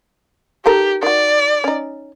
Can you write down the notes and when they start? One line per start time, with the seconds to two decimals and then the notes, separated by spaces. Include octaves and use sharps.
0.66 D#3 G4 A4 A#4
1.03 D#3 F#4 D5
1.64 C#4 D#4